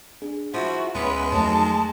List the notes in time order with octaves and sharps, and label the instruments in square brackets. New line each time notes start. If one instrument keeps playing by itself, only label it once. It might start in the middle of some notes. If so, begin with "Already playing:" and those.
[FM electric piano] D4 G#4
[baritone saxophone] F3 [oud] E4 [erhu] F#4
[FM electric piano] D2 [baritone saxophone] G#3 [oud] B3 C#4 [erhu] B4
[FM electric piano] F2 A3 [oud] F#3 A#3 D#4 [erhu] A5